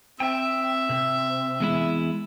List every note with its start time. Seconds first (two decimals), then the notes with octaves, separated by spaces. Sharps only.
0.20 C4 E5 G5
0.89 C3
1.60 E2 G#3 E4